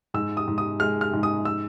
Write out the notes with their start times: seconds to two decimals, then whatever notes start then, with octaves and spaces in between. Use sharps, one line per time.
0.14 G#2 E6
0.37 D#6
0.47 G#2
0.58 D#6
0.80 G#3 F6
1.01 F6
1.13 G#2
1.23 D#6
1.45 E6